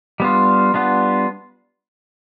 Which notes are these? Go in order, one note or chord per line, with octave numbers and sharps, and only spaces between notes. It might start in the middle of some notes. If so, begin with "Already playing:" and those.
G3 B3 D4 F4
G3 B3 D4 F4